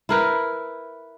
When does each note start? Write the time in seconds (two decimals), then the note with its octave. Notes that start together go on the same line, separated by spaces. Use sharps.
0.09 E4 A#4 B4